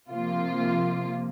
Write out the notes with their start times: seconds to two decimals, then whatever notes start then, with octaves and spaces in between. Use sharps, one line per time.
0.10 C3 F3 A#3 F4